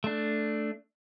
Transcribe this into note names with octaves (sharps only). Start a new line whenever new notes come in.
A3 D4